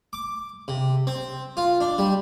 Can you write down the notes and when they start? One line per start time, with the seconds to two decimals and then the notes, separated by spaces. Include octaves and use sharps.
0.13 D6
0.68 C3
1.07 C4
1.57 F4
1.81 D4
1.98 G3